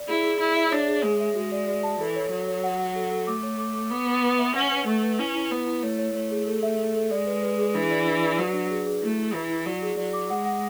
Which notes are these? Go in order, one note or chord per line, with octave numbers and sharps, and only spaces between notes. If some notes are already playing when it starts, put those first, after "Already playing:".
Already playing: D5
E4 G#4
G#4
E4 G#4
E5
D4 C#5
G#4
G#3 G#4
E5
G#3 F#4
D5
D5
A5
E3 A4
C#5
F#3 C#5
C#5
F#5
F#5
A4
A4
A3 D6
C#5
D6
D6
B3 D6
B4
B4
E5
C#4 F#5
B4
A3 C#6
B4
C#4 E4
E4
B3 B4
E4
A3 C#5
C#5
A3 C#5
G#4
A4
E5
A4
A4
G#3 D5
B4
B4
G#4
E3 D4
D5
D4
D5
F#3 B4
D4
G#4
G#4
A3 E4
E4
E3 E4
E4
F#3 D5
G#4
F#3 D5
D6
G#3 F#5
F#5